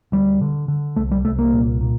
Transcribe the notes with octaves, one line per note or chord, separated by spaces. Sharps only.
D2 G3
D3
D3
C2 A3
G3
C2 A3
A#3
A#2
A#2